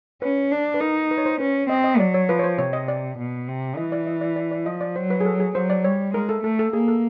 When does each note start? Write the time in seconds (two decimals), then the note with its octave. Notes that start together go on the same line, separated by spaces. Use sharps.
0.22 C#4 B4
0.51 D4
0.74 B4
0.81 D#4 A#4
1.11 B4
1.18 C#5
1.26 C5
1.40 C#4 B4
1.69 C4 D#5
1.84 D#5
1.99 F#3 D5
2.14 C#5
2.29 F3 B4
2.39 C#5
2.44 C5
2.58 C3 C#5
2.73 D#5
2.88 D5
3.18 B2
3.48 C3
3.77 E3 D#5
3.92 D5
4.07 D#5
4.21 D5
4.36 D5
4.51 D5
4.65 F3 D#5
4.81 D5
4.95 F#3 C5
5.10 B4
5.21 G#4
5.25 A4
5.40 G#4
5.55 F#3 C5
5.70 D5
5.84 G3 C#5
6.14 G#3 A#4
6.29 A4
6.43 A3 A4
6.59 A4
6.73 A#3 G#4
6.88 A4